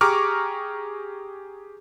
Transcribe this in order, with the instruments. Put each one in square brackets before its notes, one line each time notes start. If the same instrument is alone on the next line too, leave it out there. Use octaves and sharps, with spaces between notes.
[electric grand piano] G4 G#4 A#5 C#6 D6 F6